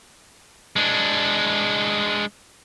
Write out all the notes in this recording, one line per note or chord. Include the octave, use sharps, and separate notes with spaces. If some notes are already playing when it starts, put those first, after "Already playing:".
G#3 D4